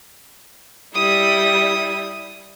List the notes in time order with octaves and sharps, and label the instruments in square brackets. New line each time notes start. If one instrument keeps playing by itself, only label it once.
[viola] G3 E4 [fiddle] D#6